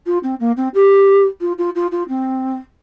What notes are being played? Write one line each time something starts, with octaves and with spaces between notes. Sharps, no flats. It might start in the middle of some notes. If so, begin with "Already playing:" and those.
F4
C4
A#3
C4
G4
F4
F4
F4
F4
C4